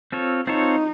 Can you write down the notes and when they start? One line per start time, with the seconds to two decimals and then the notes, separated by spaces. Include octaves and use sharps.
0.12 C4 F4 A4 C#5
0.47 C4 D#4 F4 A4 C#5